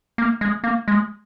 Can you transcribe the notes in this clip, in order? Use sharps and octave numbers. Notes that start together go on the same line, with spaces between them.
A#3
G#3
A#3
G#3